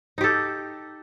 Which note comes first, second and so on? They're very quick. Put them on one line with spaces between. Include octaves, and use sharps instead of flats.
D#4 G4 A4